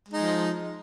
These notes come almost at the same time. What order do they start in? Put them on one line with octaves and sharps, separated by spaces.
G#3 D#4 F3